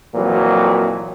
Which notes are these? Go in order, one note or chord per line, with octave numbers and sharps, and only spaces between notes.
F2 A#2 E3 F#3